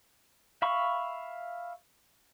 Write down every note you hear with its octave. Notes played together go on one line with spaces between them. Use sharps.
E5 F5 B5 C#6